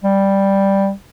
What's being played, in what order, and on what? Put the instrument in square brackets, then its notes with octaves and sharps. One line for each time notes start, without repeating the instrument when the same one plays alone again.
[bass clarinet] G3